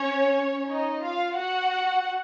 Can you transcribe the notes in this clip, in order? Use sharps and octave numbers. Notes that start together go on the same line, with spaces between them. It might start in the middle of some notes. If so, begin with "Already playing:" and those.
Already playing: C#4 C#5
D#4 D#5
F4 F5
F#4 F#5